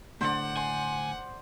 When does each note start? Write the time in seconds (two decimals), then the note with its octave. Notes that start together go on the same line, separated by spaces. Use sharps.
0.21 A2 D3 C5 D5 F#5
0.57 G#5 C6